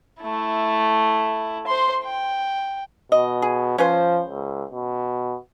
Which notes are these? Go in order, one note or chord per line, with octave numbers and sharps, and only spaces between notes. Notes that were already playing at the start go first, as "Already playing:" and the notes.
A3 E4
C5 C6
G5
B2 D#5
G#4
F3 C#4 B4 C5
C#2
B2